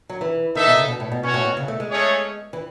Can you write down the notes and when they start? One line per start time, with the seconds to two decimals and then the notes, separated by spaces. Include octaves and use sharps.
0.09 F#3
0.21 E3
0.55 D#3 D#4 A4 E5
0.67 B2
0.77 C#3
0.88 B2
1.00 A2
1.12 B2
1.22 B2 C#4 F#4 C#5
1.34 A2
1.45 B2
1.57 C#3
1.68 A3
1.80 G#3
1.91 A3 C#4 G#4 C#5
2.53 E3